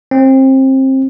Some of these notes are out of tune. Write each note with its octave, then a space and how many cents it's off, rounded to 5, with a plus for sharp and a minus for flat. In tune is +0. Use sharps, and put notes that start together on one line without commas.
C4 +25